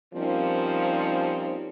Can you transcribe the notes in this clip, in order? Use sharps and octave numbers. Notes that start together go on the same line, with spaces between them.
F3 G3 A#3 C4 C#4 D#4